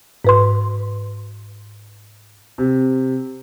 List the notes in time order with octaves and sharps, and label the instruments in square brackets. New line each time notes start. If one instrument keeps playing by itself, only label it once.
[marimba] G#2 B4 C6
[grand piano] C3